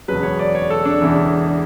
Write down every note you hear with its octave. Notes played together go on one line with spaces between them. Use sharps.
E1 E2 C#3 F#3 B4
C#5
D5
C#5
A4
D4
E1 E2 C#3 E3